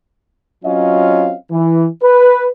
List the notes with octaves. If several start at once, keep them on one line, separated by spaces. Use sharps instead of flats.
F#3 C4 C#4 F4 D#5 F5
E3
B4